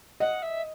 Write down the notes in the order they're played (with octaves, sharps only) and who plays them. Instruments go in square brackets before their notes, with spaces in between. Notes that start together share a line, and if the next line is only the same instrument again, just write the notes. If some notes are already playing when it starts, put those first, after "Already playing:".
[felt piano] D#5 [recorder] F#5
[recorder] E5